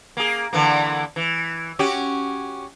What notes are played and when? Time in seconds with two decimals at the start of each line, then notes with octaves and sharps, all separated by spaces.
0.17 A#3 G#4
0.53 D3 E3 A#3
1.16 E3
1.79 C#4 F#4 G4